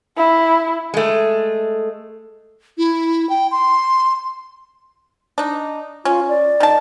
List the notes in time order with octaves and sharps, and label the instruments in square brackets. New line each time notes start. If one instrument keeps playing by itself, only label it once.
[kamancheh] E4
[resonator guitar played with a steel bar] G#3 A3
[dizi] E4
G5
C6
[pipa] D4 D#4
[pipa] C#4 [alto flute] F4
[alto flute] D5
[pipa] D#3 A5